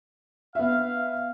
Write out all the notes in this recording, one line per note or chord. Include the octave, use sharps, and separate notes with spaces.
B3 E5 F5